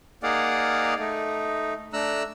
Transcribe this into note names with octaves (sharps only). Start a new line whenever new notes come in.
A#3 D#4 G#4 D5 F5 F#5
A3 D#4
A3 D4 A#5 E6 F#6